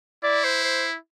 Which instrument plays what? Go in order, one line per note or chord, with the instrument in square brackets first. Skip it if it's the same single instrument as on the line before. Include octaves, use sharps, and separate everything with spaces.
[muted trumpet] E4 [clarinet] D5
[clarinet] C5
C5